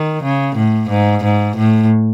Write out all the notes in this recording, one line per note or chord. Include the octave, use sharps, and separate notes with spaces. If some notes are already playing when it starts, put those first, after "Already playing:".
Already playing: D#3
C#3
A2
G#2
G#2
A2